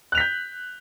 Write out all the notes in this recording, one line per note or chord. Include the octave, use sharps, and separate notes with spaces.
F#6 G6 B6 F7